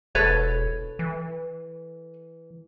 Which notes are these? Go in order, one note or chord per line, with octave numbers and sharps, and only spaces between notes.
E1 A4 B4 C#5
E3